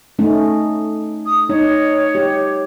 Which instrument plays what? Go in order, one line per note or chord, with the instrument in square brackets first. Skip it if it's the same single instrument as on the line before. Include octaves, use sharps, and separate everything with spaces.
[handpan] A3 C#4 D#4
[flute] D#6
[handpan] D#4 [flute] C#5
[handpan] G4